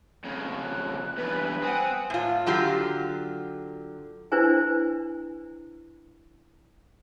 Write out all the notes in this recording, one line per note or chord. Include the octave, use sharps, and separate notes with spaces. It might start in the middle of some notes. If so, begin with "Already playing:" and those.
F2 C#3
F#6
E2 G2 B4
C4 F#5 G#5 D#6
A2 F4
D3 F#3 F4 G4
D4 E4 B4 C5 G#5